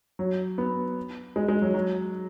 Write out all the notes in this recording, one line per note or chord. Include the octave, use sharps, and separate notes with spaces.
F#3
B3
G#3
G#3
F#3
F#3